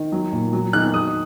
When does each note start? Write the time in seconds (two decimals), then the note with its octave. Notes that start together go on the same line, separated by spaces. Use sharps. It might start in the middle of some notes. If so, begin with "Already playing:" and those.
Already playing: D#3
0.12 F#3
0.32 A#2
0.53 F#3
0.73 D#3 F#6
0.94 D#3 D#6